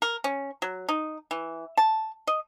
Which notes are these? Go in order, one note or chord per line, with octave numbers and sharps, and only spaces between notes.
A#4
C#4
F#3
D#4
E3
A5
D#5